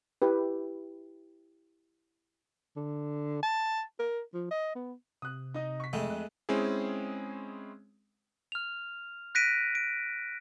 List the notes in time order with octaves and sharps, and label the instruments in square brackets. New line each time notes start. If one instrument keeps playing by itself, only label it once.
[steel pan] E4 G4 B4
[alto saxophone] D3
A5
A#4
F3
D#5
B3
[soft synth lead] C3 [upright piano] D#6 F#6
[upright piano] D#4 D#5
C#6 B6
[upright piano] F2 [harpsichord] G#3 A3
[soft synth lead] F#6
[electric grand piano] G#3 C4 C#4 E4 G#4
[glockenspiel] F6 F7
F#6 A#6 B6 D7 D#7
D7